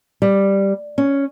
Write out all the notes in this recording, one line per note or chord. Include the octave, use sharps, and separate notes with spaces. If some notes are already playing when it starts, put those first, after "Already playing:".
G3
C#4